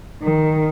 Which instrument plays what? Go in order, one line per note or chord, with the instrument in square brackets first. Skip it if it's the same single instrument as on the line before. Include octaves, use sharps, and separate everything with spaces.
[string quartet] D#3